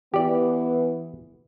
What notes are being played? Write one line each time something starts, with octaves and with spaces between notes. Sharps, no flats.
E3 B3 G4 D5